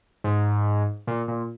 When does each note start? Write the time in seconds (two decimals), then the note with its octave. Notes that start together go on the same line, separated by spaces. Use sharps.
0.24 G#2
1.07 A#2
1.28 A#2